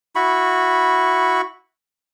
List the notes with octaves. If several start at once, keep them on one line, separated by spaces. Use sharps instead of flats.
E4 F#4 B5 C#6